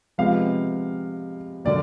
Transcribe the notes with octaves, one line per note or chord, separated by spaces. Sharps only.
C3 F3 G#3 B3 F5
D3 F#3 A#3 D5